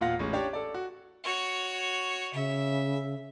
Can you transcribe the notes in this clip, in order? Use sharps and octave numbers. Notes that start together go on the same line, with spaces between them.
E1 A#2 F4 F5 F#5 A#6
A1 G#3 C#4
D4 G4 C#5 D5
A4 D5
F#4
F#4 C#5
C#3 E5